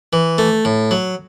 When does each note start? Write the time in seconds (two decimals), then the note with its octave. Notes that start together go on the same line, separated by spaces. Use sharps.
0.13 E3
0.38 A3
0.65 A2
0.91 F#3